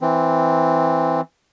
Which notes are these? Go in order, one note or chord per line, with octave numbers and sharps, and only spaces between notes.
E3 C4